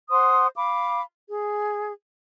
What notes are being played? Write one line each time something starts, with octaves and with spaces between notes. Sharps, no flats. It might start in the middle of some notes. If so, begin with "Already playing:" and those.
C5 F#5 C6 D#6
F5 B5 D6
G#4